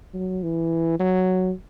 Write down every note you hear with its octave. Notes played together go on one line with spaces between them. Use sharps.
F#3
E3
F#3